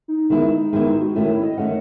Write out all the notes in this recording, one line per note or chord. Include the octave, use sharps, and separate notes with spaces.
D#4
D#3 G#3 B3 D#4 E4
D#4
D#3 G#3 B3 D#4 E4
D#4
G#4
F#4
D#3 A3 C#4 E4
E4
D#5
D#3 A3 C#4 F#5